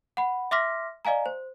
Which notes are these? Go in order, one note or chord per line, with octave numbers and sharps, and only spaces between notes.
F#5 B5
E5 C6 D6 F6 A#6 B6
D5 D#5 F5 G#5 A#5
C5